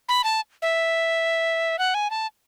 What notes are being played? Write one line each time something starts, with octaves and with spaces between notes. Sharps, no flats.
B5
A5
E5
F#5
G#5
A5